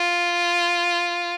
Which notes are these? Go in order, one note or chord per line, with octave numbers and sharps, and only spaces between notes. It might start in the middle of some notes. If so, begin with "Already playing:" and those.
Already playing: F4